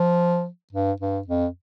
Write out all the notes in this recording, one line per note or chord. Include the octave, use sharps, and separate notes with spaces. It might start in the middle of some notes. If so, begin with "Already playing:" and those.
Already playing: F3
G2
G2
F2